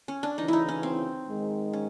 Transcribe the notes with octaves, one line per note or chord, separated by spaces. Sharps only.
C#4
D4
D2 C#3 E3 D#4
D#4 E4
C#4
C4
G#2 D#3 G#3
C#4